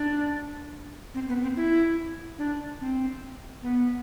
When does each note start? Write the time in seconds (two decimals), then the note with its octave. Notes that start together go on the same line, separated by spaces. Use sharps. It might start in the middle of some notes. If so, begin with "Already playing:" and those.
Already playing: D4
1.14 C4
1.29 B3
1.42 C4
1.56 E4
2.38 D4
2.80 C4
3.63 B3